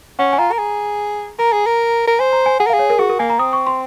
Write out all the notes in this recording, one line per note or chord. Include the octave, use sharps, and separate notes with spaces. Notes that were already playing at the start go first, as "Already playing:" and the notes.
C#4 F#5
G#5
F4 A#5
A#4
G#4
A#4 A#5
G#4
A#4
A#4
C5 G#5
A#5
G#5
G#4 F#5
A#4
F5
G#4
C#5
A#4
F#4 G#4
A#4
A#3 G#5
A#5
C4 D#6
C#6
C6